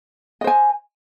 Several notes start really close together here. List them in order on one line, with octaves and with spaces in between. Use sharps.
D#5 C5 G#5